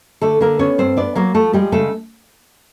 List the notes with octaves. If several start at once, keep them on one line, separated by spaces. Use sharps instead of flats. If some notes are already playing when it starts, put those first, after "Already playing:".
D3 A3 A4
D3 A#3 A#4
B3 C#4 C#5
G2 C4 C5
B3 D4 D5
F#3 A#3 A#4
F3 A3 A4
G3 G#3 G4
C#3 A3 A4